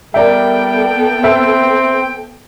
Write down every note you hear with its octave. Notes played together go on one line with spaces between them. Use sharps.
G3 B3 A4 A#4 D5 E5 G5
C4 B4 E5 E6